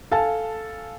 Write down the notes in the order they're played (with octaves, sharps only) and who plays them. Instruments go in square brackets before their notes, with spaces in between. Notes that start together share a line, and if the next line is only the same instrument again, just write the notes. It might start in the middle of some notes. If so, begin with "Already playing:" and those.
[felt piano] A4 F5 G#5 A5